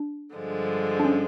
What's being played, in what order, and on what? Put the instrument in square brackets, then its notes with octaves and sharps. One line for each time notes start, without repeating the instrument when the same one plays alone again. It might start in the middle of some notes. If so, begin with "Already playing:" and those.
Already playing: [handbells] D4
[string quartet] G2 D3 F3 G#3
[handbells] D4
C#4